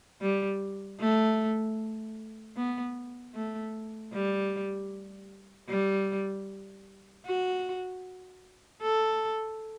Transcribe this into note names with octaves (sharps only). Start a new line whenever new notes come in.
G3
A3
B3
A3
G3
G3
F#4
A4